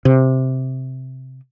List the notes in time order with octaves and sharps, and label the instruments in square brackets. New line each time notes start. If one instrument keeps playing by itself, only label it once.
[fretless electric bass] C3